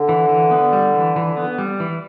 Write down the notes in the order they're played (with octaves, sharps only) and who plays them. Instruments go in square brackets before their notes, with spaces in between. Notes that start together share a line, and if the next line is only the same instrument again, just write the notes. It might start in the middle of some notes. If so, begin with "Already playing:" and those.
Already playing: [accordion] D3
[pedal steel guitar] E3
E3
B3
G3
E3
E3
B3
G3
E3